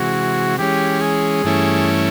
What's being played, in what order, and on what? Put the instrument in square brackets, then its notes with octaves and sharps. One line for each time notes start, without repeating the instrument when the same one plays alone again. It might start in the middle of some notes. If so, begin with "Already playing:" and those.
Already playing: [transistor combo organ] C3 E3 G#3 [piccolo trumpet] F#4
[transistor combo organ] E3 G#3 C#4 [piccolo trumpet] G4
[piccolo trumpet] G#4
[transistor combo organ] G2 E3 A3 C#4 E4